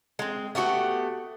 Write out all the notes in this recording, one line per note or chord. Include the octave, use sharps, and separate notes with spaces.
G#3 C4
A3 B3 F#4 G4